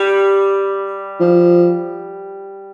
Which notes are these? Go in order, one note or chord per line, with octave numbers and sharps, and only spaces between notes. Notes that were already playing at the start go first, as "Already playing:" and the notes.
Already playing: G3
F3